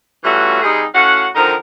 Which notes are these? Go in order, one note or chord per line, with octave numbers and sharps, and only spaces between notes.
E3 G3 A3 C#4 F4 F#4
C3 G3 D#4 G#4
A2 C#4 F#4 F5 F#5
D3 D#3 F3 D#4 A#4